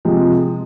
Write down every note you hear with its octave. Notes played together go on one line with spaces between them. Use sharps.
C3 F3 G#3